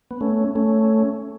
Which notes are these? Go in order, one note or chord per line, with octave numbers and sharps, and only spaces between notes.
B3
A3 C#4
A3 C#4